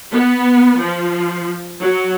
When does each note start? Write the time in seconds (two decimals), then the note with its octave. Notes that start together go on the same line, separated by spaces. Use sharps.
0.13 B3
0.79 F3
1.80 F#3